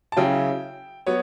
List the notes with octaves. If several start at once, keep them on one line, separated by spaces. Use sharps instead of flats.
A5
C#3 F#3 C#4 E4 G5
F#3 B3 C#5